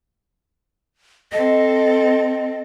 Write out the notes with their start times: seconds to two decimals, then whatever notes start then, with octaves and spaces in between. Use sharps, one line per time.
1.32 C4 A4 D#5